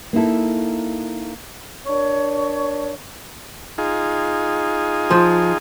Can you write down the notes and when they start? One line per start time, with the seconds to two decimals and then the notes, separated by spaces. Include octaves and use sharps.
0.13 A#3 D#4 E4 A4
1.86 D4 A#4 C#5
3.78 D#4 F4 G#4
5.10 F3